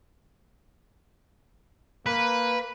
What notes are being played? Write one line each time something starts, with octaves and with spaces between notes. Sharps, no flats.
A#3 B4